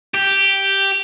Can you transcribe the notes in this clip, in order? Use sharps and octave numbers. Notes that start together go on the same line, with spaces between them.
G4